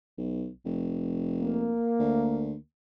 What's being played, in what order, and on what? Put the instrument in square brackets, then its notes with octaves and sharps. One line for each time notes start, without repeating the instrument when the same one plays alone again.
[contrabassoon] B1
F1
[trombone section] A#3
[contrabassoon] D2